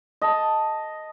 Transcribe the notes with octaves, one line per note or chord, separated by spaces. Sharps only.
D#5 A5